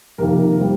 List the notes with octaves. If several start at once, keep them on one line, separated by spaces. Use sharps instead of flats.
F2 C3 D#3 A#3 A#4
G3 C4